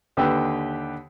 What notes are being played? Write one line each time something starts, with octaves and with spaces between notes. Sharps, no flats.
D#2 D3 G4 B4 G5 E6